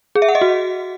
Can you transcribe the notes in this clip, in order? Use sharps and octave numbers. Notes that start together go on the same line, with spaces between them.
G#4
E5
F#5
D#5
F#4